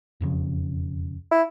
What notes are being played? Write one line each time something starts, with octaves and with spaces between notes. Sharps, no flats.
E1 F2 C#3
E4